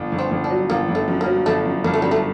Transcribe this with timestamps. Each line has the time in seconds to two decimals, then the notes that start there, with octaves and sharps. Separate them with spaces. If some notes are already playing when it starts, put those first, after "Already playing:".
Already playing: G1
0.12 G1
0.19 C4
0.31 G1
0.44 D4
0.50 F#3
0.70 G1 A#3
0.88 G1
0.95 A3
1.08 F#2
1.21 A#3
1.26 F#3
1.46 G1 A3
1.65 F#2
1.84 G1 A#3
1.94 A3
2.02 F#2 G3
2.11 A3